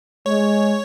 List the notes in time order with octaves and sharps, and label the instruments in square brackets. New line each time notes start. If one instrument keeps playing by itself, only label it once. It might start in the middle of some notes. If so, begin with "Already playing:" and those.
[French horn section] G#3 [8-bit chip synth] C#5